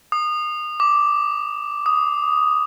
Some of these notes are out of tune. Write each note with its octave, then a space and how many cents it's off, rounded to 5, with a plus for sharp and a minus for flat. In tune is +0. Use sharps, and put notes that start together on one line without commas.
D#6 -30
D6 -5
D#6 +0